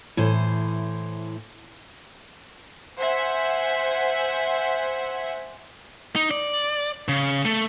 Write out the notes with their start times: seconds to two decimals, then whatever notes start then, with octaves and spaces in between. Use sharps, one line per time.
0.17 A2 E3 C5
2.99 C5 E5 F#5 G#5
6.16 D#4
6.31 D5
7.09 C#3
7.45 A3